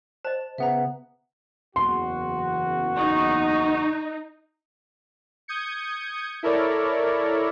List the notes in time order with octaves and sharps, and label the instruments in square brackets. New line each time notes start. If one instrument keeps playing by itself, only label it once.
[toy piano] C5 D#5 [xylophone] A5
[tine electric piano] C#3 B3 [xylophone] E5 F#5 A#5
[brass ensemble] F#1 E2 F#4 [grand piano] C6
[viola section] D#4 [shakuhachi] C#6
[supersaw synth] D#6 G6 G#6 C#7
E4 A4 A#4 C#5 D5